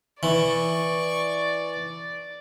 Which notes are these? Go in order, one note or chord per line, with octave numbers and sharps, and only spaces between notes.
E3 D5 C#6